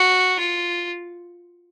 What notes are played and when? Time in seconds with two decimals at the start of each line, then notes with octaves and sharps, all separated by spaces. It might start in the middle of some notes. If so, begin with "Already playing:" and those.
Already playing: F#4
0.39 F4